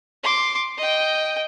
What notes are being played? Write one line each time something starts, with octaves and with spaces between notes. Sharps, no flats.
C6 D6
D#5 G5